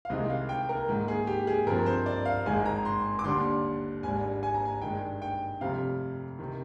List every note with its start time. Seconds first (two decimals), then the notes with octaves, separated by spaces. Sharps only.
0.05 F5
0.10 C2 C3 D#3 G#3 C4 D#5
0.30 F5
0.49 G5
0.69 A#4
0.89 G#2 D#3 A#3
1.08 G#4
1.27 G4
1.47 G#4
1.67 G2 F3 C4 A#4
1.86 C5
2.06 D5
2.26 F5
2.46 G#1 G#2 D#3 G#3 G#5
2.66 A#5
2.85 C6
3.19 D6
3.24 D#2 D3 G3 D4 C6
4.03 G#1 G#2 G3 D4 G#5
4.43 G#5
4.54 A#5
4.65 G#5
4.81 G2 D#3 G#3 D4 G5
5.22 G5
5.61 F1 F2 C3 G3 C4 F5
6.39 C3 D#3